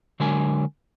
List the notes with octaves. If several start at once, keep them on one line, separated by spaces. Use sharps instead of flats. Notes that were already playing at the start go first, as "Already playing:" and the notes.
D3 F#3 G#3 D4 A#4 G#5